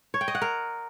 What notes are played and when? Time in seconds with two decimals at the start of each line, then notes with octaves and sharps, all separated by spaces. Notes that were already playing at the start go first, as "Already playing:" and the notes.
0.14 C#5
0.21 G5
0.28 D#5
0.35 F#5
0.41 A#4